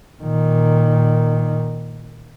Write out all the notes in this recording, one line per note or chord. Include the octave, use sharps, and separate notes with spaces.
A#2 D#3